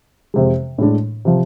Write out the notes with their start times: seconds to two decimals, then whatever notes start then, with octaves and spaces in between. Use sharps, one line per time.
0.34 F2 C3 G#3
0.78 A2 G#3 D4
1.25 C3 F3